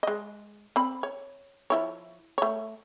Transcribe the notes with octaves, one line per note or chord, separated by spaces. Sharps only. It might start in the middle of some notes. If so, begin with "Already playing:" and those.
G#3 D#5
C4 B5
C#5
F3 E4 C#5
A3 C#5